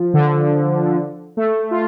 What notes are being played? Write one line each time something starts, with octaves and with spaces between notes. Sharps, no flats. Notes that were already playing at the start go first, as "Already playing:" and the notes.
Already playing: F3
D3
A3
F4